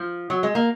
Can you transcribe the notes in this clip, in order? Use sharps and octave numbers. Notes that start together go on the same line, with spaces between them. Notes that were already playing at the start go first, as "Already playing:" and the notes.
Already playing: F3
F#3
G#3
A#3